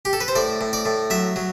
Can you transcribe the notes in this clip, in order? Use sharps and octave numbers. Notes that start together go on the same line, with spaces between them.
G4
A4
B4
C5
A2 D5
A2
D5
A2
F#3 E5
F#3